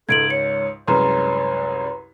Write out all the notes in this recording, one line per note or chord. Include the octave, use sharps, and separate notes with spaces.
C#2 G#2 A4 G#6 D7 F#7
C#5 C#7
C2 F#2 G#3 B4 C#5 A#5 C6